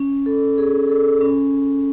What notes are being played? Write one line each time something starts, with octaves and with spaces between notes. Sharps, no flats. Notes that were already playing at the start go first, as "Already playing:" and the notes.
Already playing: C#4
A4
G#4
A4
C#4